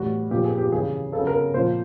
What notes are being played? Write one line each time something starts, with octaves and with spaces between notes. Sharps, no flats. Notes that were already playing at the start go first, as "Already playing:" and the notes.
Already playing: A2 E3 G3 F#4
A#2 F3 G4
G#4
G4
C#3 E3 G3 G#4
C#3 A4
F#3
A#4
A#2 F3 C5